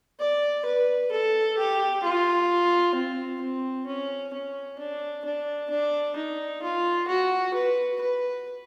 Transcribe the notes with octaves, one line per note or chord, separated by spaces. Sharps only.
D5
B4
A4
G4
F4
C4
C4
C#4
C#4
D4
D4
D4
D#4
F4
F#4
B4
B4